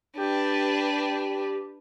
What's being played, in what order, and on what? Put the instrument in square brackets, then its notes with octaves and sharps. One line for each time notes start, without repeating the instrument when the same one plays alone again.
[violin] D4 B4 [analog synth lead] G4